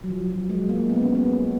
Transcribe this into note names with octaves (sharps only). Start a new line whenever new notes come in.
F#3
F3
F#3
G#3
A#3
B3
C#4
B3